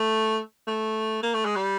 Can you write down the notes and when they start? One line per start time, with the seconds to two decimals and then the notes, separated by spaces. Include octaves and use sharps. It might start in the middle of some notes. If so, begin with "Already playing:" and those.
Already playing: A3
0.67 A3
1.23 A#3
1.34 A3
1.45 G#3
1.56 G3